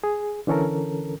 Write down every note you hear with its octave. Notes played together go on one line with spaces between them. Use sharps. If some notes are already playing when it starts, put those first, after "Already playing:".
G#4
D3 E3 C#4 A4 A#4